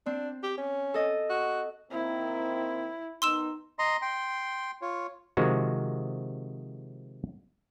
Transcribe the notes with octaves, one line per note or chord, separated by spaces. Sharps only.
C4 D4
G4
C#4
A4 D#5
F#4
D#3 A#3 C4 E4
D#3 B3 D#4 C6 E6 E7
D#5 A#5 C6
G5 C6
F4 C#5
C3 D#3 F3 G#3 F#4